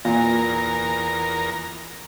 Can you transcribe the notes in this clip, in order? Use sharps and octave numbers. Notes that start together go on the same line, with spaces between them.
E2 A#2 A#4 A#5